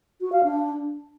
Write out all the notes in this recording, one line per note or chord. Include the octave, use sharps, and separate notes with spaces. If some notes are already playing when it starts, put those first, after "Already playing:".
F#4
F5
D4